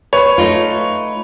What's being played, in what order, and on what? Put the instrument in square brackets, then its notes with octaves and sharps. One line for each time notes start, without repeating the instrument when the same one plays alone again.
[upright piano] B4 C#5
[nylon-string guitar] A3 D#4 F4